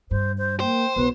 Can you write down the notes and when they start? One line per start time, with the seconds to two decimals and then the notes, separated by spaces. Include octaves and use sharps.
0.11 G2 C5
0.38 C5
0.60 A#3 C5 G5
0.96 B1 B3 B4